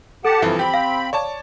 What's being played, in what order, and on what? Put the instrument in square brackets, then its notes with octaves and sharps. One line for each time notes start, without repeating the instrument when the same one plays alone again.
[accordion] G4 F#5 A5 [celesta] A4
[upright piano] G2 E3 F3 [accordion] C3
[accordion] C4 B5 [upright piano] G4
[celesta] F5
[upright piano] C#5 D5 A5